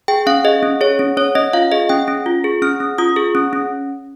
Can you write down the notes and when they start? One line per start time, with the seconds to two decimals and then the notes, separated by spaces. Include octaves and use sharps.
0.08 G#4 G5
0.27 C#4 F5
0.44 G#4 D#5
0.63 C#4
0.81 G#4 C#5
0.99 C#4
1.17 C#4 C#5
1.35 C#4 D#5
1.53 F4 F5
1.72 G#4 D#5
1.89 C#4 G5
2.08 C#4
2.26 F4
2.44 G#4
2.62 C#4 F6
2.80 C#4
2.98 F4 D#6
3.16 G#4
3.35 C#4
3.53 C#4